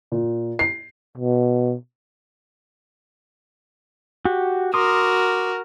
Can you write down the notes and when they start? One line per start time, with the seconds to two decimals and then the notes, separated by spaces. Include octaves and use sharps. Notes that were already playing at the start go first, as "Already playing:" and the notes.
0.12 A#2
0.59 C7
1.17 B2
4.25 F#4 G4
4.74 F#4 A#4 C6 D6 D#6